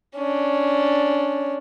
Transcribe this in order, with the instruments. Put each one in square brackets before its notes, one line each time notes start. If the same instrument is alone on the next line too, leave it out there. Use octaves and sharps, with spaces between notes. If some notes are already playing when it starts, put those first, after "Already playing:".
[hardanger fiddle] C#4 D4